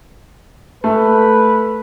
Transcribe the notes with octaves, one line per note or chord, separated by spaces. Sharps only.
A3 B4